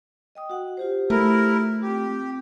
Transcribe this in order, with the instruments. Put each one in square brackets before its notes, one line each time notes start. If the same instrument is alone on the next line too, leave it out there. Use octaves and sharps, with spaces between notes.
[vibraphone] D#5 G5 D#6
F#4 F#5
F4 G4 C5
[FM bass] A3 [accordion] E4 A#4
[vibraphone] C4 F4 [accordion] G4